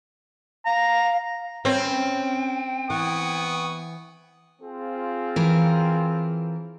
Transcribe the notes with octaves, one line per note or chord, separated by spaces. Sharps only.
F5 A#5
C4 C#4 B4 G5
E3 B3 C#6 D#6
C4 F4 G#4
E3 A#4